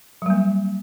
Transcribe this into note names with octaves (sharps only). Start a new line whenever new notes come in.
F#3 G3 A#3